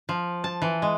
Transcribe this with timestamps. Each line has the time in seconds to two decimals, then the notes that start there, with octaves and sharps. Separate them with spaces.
0.09 F3
0.44 A5
0.62 E3
0.82 G#3